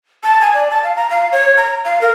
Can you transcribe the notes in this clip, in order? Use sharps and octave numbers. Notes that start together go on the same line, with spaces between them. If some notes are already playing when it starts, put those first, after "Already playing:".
A5
G#5
D5
A5
F5
A#5
F5
C#5
A#5
F5
A#4